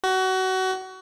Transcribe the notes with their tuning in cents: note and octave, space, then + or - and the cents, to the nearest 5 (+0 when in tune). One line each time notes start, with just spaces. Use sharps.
F#4 +25